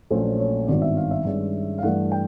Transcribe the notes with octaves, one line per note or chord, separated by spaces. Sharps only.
A#1 A#2 F#3 A3 C#4 C5
C#5
G#1 G2 D#3 G3 B3 D5
E5
F5
E5
G2 D#3 G#3 C#4
F5
G2 E3 A3 F#5
G5